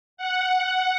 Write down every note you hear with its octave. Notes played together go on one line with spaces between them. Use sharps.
F#5